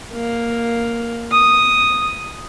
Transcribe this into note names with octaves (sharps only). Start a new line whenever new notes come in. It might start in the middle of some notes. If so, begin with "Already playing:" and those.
A#3
D#6